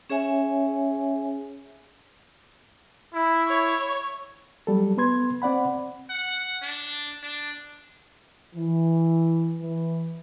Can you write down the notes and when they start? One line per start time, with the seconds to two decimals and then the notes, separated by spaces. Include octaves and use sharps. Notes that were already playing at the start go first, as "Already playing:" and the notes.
0.10 C#4 G#4 C#5 E5 G#5
3.14 E4
3.47 C#5
4.67 F#3 G3 A4
4.97 B3 B4 C6 G#6
5.42 C4 D5 F#5 B5
6.10 F#5
6.63 D4
7.23 D4
8.54 E3
9.61 E3